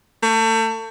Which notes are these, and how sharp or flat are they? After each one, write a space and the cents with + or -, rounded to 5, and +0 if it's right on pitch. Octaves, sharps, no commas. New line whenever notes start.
A3 +35